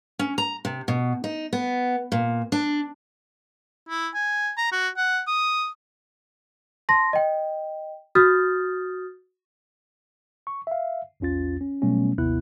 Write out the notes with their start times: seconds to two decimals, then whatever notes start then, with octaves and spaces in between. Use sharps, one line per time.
0.19 C#4
0.38 A#5
0.65 C3
0.88 B2
1.24 D#4
1.53 B3
2.12 A#2
2.52 D4
3.89 E4
4.14 G#5
4.58 A#5
4.72 F#4
4.97 F#5
5.27 D#6
6.89 A5 C6 A#6
7.13 D#5 G5
8.15 F#4 D#6 F6 G6 A6
10.47 C#6
10.67 E5 F5
11.20 A#1 E2 C#4 F4 A6
11.61 C#4
11.82 B2 F#3 G3 A3 B3 C#4
12.18 G#1 D#2 C3 B3 E4 F#6